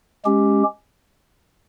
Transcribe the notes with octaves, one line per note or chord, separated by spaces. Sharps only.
G#3 C#4 G4